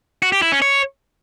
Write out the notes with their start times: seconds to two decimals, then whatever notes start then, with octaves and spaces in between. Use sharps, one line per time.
0.22 F#4
0.32 G4
0.42 E4
0.52 C#4
0.62 C#5